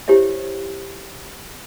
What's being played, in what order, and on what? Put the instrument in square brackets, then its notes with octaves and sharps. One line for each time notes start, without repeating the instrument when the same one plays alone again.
[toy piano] E4 G4 C5 C#5 E5